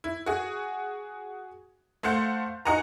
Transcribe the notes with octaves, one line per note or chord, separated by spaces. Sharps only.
E4
F#4 G#4
A3 C5 F5 F#5 G6
D#4 F#4 D#5 F#5 G#5 A#5